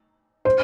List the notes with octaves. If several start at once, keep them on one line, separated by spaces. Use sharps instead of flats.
C5